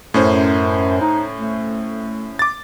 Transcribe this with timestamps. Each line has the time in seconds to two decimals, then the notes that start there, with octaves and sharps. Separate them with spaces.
0.14 F#2 A2 C#4 C5
1.01 D#4
1.36 A3
2.39 D6 A6